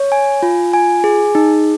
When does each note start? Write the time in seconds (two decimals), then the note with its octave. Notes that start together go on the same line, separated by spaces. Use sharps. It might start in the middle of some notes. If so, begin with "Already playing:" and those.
Already playing: C#5
0.12 G#5
0.43 F4
0.73 G#5
1.04 G#4
1.35 D#4